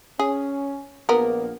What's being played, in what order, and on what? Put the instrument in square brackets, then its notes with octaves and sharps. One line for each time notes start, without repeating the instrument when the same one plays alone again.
[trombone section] C#4 [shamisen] G#4
[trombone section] A#1 A#3 [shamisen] B3 A#4